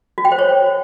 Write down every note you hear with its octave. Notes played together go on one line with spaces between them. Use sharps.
F#4
G5
C5
C#5